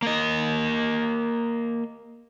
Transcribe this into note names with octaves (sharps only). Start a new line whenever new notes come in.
A#3 D#5